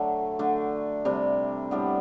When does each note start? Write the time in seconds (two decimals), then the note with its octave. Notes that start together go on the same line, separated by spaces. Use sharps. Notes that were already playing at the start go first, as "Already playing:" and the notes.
Already playing: D3 F#3 A3 D4
0.39 D3 A3 D4
1.05 C3 G3 D4
1.71 A2 G3 B3 D4